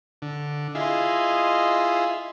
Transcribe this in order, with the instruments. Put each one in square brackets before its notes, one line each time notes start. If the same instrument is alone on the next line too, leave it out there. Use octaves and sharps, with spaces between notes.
[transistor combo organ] D3
[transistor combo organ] E4 F4 G#4 [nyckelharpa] D#5 C6